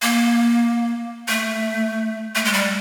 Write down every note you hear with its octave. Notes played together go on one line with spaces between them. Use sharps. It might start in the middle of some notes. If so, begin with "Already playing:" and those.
A#3
A3
A3
G#3
G3